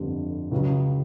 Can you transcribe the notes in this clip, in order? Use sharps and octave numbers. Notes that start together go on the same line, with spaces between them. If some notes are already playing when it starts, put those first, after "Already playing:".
Already playing: G1 F2 D3 G3
C#2 C#3 F#3